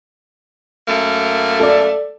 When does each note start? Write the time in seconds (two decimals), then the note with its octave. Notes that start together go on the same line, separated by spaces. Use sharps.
0.88 F#2 A3 A#3
1.60 A4 D5